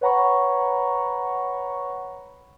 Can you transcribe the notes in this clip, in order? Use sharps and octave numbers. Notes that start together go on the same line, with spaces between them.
B4 C#5 F#5 A#5 B5 C#6